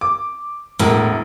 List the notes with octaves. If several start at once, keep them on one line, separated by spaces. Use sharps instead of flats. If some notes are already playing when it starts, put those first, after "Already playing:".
D6
E1 A2 A#4